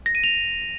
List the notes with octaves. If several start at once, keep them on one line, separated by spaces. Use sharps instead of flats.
A#6
D#7
F7